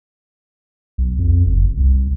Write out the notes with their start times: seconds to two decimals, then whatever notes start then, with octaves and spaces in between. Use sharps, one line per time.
0.98 B1
1.18 F2
1.46 F#1
1.77 C2